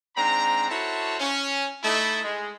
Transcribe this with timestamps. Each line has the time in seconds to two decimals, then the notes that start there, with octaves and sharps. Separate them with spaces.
0.17 G#2 C4 D4 A#5
0.69 E4 F#4 A4 C5 C#5 A5
1.19 C#4
1.83 A3 D#4 E4
2.23 G#3